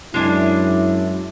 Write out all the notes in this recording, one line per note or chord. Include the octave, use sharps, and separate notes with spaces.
F#2 G#3 D4 E4 G#5